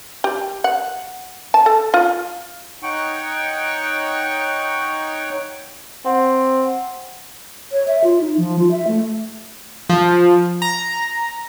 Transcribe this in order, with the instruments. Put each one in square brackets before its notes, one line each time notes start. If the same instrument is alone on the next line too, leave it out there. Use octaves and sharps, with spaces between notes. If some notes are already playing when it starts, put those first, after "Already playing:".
[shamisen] G4
F#5
A5
A4
F4
[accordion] D#4 C#5 F#5 G5 C#6
[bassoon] C4 [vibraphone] F#5
[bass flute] C#5
E5
F4
D#4
F3
F4
E5
A3
[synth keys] F3
A#5